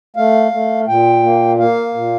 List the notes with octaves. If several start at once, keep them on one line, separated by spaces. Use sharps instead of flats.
A3 F5
A3
A#2 G5
A#3
A#3 F5
A#2